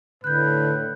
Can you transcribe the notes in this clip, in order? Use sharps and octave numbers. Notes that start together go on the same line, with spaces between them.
A2 D3 B4 F#6 G6